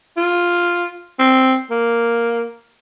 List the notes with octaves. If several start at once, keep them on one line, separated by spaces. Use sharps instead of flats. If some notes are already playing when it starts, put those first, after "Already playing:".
F4
C4
A#3